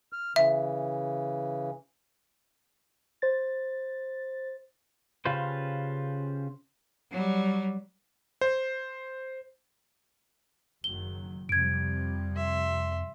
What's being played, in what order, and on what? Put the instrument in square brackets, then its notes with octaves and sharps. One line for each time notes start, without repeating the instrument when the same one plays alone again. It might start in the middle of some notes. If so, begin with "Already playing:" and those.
[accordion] F6
[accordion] C#3 E3 [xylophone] E5
[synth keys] C5 A6
[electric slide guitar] C#3 C#4 F4 G4 B4 C5
[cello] F#3 G3
[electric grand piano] C5
[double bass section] F#1 D#3 F#3 [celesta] G7
[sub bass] F2 [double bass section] C3 F3 G3 [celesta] G#6 D7
[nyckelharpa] E5 C6